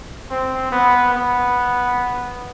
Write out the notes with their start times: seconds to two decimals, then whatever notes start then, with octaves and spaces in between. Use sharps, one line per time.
0.30 C4
0.72 B3
1.14 B3